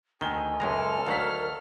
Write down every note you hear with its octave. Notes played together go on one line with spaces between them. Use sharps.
D2 D#3 G#5 G7
C#2 F#2 G#3 A4 A#5 F6
D2 D#3 F#3 A#4 F5 F#5 B6